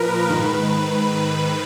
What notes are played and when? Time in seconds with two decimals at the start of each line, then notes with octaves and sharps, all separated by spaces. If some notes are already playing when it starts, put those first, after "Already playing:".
Already playing: A#2 F3 A#4 B4
0.29 G#2 D#3